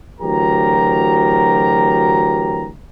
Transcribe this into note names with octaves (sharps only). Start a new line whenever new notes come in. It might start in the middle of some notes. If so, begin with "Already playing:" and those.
D2 E3 F#3 G4 A#4 A#5